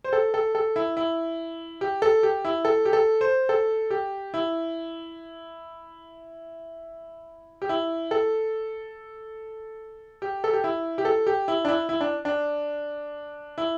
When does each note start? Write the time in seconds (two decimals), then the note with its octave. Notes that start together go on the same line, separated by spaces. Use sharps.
0.04 C5
0.13 A4
0.34 A4
0.55 A4
0.76 E4
0.97 E4
1.81 G4
2.02 A4
2.23 G4
2.45 E4
2.65 A4
2.85 G4
2.93 A4
3.21 C5
3.49 A4
3.91 G4
4.34 E4
7.62 G4
7.69 E4
8.11 A4
10.22 G4
10.44 A4
10.53 G4
10.64 E4
10.98 G4
11.05 A4
11.27 G4
11.48 E4
11.65 D4
11.68 E4
11.89 E4
12.01 D4
12.25 D4
13.58 E4